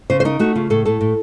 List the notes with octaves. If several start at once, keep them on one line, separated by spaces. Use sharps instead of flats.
C#3 C5
C5
D#4 A#4
A3 F#4
C#3 F4
A2 A4
A2 A4
A2